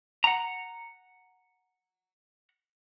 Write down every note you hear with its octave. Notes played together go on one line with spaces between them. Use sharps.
F#5 A#5